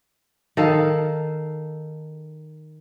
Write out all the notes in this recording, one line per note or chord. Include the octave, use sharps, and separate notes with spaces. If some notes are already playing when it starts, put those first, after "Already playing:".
D#3 A4 F5